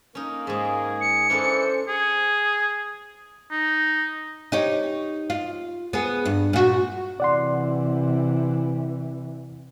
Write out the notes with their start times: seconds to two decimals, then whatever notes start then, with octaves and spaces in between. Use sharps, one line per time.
0.15 A#3 C#4 D#4 A#4
0.47 G#2 G#3 G#4
1.01 C#7
1.30 E3 C#4 D4 A4 C5
1.88 G#4
3.51 D#4
4.52 D#4 G4 C#5
5.30 F4
5.93 B3 G#4
6.25 G2
6.53 A#2 F#4
7.20 C3 E3 D5 F#5 C6